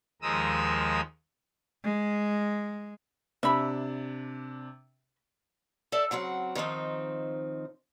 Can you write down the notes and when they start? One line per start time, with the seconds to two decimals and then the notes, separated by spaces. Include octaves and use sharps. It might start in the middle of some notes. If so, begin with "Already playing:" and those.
0.22 D#2 F3 G#3 A#4 D#6 E6
1.84 G#3
3.43 C3 D4 E5 B5
5.92 A4 D5 E5 A5
6.11 C#3 F#3 C4 F#5
6.55 D#3 F3 C4 D#4